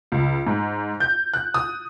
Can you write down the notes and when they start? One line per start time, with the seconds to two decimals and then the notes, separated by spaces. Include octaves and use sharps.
0.12 C#2
0.47 G#2
1.00 G6
1.34 F#6
1.54 D#6